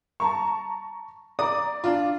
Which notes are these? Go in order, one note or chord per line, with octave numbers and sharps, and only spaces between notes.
A5 A#5 C#6
D5 A#5 D6 D#6
D4 F4